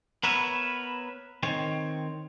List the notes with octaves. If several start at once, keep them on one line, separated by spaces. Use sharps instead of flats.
B3 A#4 B4 C#5 E5
D#3 C4 C#5